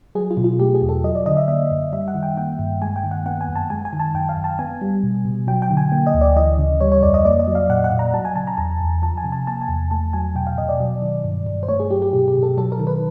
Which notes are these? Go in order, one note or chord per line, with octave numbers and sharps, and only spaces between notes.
F#3 G#4
F4
B2
F4
A3 G4
G#4
E2
A4
F#3 D#5
D5
D3 D#5
E5
A#3 E5
F#2
G3 E5
F#5
D#3
G5
A#3 G5
G2
G#3 G#5
G5
D#3
F#5
B3 F#5
G#5
F#2
A5
G#3 G#5
G#5
D#3
A5
F#2 G5
F5
F#2
A5
B3 G#5
G3
B2
B2
F#3 G5
G5
D3
G#5
A#3
D#5
D2
D5
E3 D#5
C#3
G3 C#5
C#5
F2 D5
D#5
A#3 D5
D#5
F#3
F5
A#2 F#5
F#5
A#2
A#5
F#3 A5
G#5
C#3 A5
A#5
E2 A5
E2
F3 A5
G#5
C3
A5
A#3 A5
G#5
E2
A3 A5
F#3 G#5
B2 G5
F5
B2 D#5
D5
F#3
D#3
G2
G2
C5
A3 C#5
G#4
F#3 G4
G4
B2 G4
G4
B2
A4
F#3 A4
A#4
D#3
B4